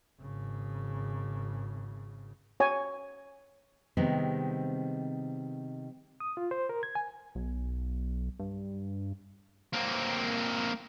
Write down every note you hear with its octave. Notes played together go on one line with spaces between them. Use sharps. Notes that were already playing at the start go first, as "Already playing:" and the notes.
G#1 C#3
C#5 G#5
C3 D#3 G3 G#3 B3 C4
D#6
F4
C5
A#4
G#6
G#5
B1
G2
A#3 C4